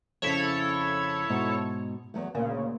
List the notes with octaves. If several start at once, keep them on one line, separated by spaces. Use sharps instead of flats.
F2 C#3 E4 A4 C#5
G#2 B2
E2 F#3 A3
D2 A#2 C#3 A#3